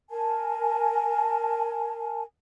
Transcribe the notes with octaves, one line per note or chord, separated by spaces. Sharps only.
A#4 G#5 A5